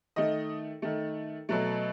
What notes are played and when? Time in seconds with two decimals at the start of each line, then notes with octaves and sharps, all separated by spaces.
0.16 D#3 A3 D#5
0.82 D#3 A3
1.49 B2 F#3 A3